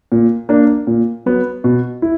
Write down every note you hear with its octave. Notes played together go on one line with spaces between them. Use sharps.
A#2
A#3 D4
A#2
F#3 B3
B2
E4